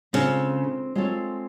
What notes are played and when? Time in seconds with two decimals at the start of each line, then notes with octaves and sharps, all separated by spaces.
0.13 C#3 G#3 C4 F4 A4 C#5
0.95 G#3 C4 F4 A4 C#5